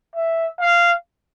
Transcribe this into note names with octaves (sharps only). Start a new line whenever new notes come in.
E5
F5